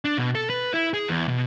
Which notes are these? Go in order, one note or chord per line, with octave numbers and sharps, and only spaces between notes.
D4
B2
A4
B4
E4
G#4
E2
B2